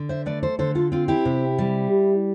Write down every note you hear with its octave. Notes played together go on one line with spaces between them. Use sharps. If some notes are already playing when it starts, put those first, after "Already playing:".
Already playing: D3
C5 E5
A3 B4 D5
A4 C5
D3 A4 C5
F4 A4
C4 F4
E4 G4
C3
G3